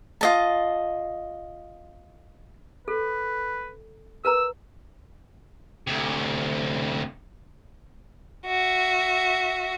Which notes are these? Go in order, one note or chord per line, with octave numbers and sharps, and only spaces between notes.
F4 D#5 A5
A4 B4
A#4 B4 A#5 E6
D2 C3
F#4 E5